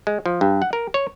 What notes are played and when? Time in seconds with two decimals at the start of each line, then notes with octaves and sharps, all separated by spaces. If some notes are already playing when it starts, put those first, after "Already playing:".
0.07 G#3
0.26 F3
0.41 G2
0.62 F#5
0.73 A#4
0.94 C#5